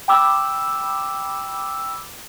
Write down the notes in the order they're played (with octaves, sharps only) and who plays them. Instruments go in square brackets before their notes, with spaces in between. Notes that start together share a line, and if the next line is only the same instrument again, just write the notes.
[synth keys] G5 B5 D6 E6